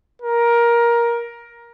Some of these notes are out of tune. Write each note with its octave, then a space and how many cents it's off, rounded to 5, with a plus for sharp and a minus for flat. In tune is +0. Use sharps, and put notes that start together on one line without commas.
A#4 +15